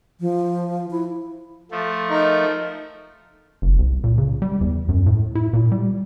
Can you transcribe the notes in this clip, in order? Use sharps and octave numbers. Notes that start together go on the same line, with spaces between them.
F3
E4
F3 A3
D#4 A#4
F#1
C2
A#2
C#3
G3
E2
F#2
A2
E4
A#2
G3